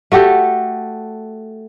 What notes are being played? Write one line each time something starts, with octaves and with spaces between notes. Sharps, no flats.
A3 F#4 G4 A4